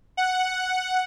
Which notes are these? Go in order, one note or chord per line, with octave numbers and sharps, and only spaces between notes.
F#5